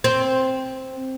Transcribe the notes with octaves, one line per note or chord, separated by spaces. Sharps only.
C4